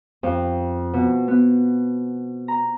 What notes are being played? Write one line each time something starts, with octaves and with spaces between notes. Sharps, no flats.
F2
B2
B3
A#5